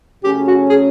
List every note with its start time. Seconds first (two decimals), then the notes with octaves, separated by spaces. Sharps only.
0.24 C#3 F#3 A3 C#4 G4
0.47 F#4
0.70 G#4